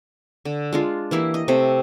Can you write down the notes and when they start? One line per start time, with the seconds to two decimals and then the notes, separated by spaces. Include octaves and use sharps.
0.45 D3
0.73 G#3 D4 F4
1.11 E3 A#3 E4 G4
1.34 D#5
1.48 C3 A3 C4